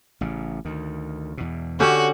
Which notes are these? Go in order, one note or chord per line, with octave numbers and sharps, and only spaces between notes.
A1 C#3
D2 D#3
E2 B2
D3 C#4 F#4 G4